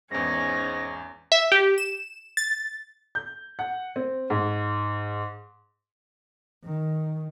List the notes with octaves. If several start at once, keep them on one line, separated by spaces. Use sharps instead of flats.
G#1 E2 G#2 C#4 A#6
E5
G4
E7
A6
G6
F#5
C4
G#2
D#3